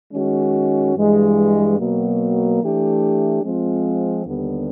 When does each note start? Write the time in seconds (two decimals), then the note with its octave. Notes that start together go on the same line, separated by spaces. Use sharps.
0.13 D#3 G#3 C#4 F#4
0.96 G2 E3 G#3
1.79 B2 F#3 A#3
2.61 E3 A3 D4 G4
3.43 F3 G#3 C4 F4
4.26 D#2 D3 G3 B3